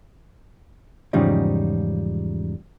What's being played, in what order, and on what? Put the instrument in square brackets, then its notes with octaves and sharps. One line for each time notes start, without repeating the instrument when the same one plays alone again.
[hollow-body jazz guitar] E2 G#2 C#3 F3 G3 D#4